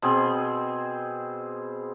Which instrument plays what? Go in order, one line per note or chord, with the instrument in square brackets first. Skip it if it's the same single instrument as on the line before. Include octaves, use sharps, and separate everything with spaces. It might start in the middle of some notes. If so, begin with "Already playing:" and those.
[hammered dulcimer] B2 C4 G#4 B5